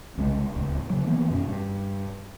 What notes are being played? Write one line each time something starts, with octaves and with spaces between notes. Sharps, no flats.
C2 C#3 G#3
D1 C#2
C#3 F#3
D#3 E3 A#3 B3
F#2 B2 C#4
G2